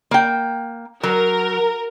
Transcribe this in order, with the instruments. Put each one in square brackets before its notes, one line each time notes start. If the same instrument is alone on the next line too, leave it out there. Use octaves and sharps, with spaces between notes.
[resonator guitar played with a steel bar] A#3 G5
[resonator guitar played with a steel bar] F#3 [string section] A#4